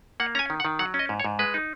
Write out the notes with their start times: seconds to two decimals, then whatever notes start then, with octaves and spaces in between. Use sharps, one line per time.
0.20 A#3 F#5
0.35 C#4 A#5
0.39 G#5
0.50 D#3
0.60 F#5
0.65 D#3
0.79 F#3 F#5
0.94 C#4
0.99 D#5
1.09 G#2
1.20 C#5
1.24 G#2
1.39 G#3 B4
1.54 D#4